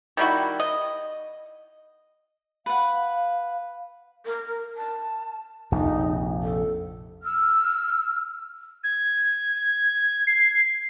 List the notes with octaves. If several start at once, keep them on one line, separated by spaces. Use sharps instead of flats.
D#3 G3 E4 F#4
D#5
B4 F5 F#5
A#4
A5
A#1 F2 C3 D#4
A4
E6 F6
G#6
C7